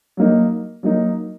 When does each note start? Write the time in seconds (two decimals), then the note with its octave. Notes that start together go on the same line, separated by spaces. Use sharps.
0.17 F#3 A#3 D#4
0.83 F#3 A#3 D#4